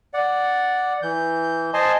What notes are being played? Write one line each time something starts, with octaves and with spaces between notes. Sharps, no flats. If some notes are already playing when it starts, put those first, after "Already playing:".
D5 F#5
E3 G6
C5 D#5 G#5 A5 C6